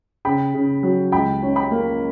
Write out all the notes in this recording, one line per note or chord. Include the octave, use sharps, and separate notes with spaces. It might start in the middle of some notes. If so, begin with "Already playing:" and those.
C#3 G5 B5
C#3
F#3
C#2 G5 B5
C#4
G5 B5
A#3